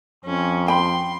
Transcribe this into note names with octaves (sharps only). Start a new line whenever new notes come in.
F2 C#4
G5 B5 C6